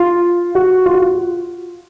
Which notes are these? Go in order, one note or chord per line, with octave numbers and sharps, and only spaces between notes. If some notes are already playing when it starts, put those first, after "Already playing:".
Already playing: F4
F#4
F4
F#4
F4